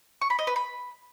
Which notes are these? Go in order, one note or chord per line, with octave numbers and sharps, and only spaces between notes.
C#6
B5
D#5
B4
B5